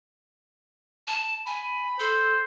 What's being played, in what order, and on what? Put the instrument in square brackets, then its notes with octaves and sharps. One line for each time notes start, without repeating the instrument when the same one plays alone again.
[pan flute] A5
[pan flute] G#5 [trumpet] B5
[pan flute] A4 [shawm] C5